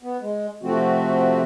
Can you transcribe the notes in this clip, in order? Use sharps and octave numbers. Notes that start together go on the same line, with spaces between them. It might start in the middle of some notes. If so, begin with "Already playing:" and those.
B3
G#3
C3 F3 A3 C4 F#4